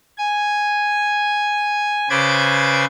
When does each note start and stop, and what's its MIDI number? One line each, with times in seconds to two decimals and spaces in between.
0.18 2.09 80
2.10 2.85 49
2.10 2.85 71
2.10 2.85 72
2.10 2.85 86
2.10 2.85 92
2.10 2.85 93